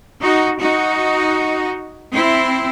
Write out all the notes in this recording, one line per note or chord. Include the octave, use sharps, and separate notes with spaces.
D#4 F#4
D#4 F#4
C4 E4